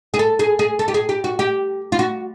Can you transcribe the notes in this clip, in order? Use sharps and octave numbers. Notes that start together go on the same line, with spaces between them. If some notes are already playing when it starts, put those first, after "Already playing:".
G#4
A4
G#4
G#4
A4
G4
G#4
G4
F#4
G4
F4
F#4